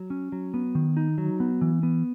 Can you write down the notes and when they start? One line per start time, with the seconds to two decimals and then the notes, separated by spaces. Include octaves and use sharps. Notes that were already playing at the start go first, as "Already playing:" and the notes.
Already playing: F#3
0.10 C#4
0.32 F#3
0.54 B3
0.75 D#3
0.97 D#4
1.18 F#3
1.40 B3
1.61 E3
1.83 B3